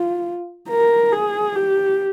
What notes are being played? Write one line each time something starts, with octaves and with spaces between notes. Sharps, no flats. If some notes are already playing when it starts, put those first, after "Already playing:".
Already playing: F4
A#4
G#4
G4